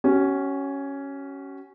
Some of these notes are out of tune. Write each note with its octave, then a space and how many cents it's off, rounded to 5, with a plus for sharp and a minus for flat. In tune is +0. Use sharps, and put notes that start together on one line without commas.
C#4 +0 F#4 +45